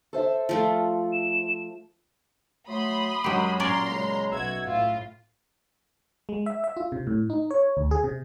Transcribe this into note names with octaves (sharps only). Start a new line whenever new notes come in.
A4 C5 E5
F3 A3 F4
E7
F#3 A3 B5 C6 D#6
F#2 F#3 G#3 G4
A#2 C#4 A#4 D5 A#5 C6
C#3 G#3
B1 B2 F#4 E5 E6 G#6
A2 F4
G#3
E5
E5
F4
C3
A2
D#4
C#5
D2
G#4
C3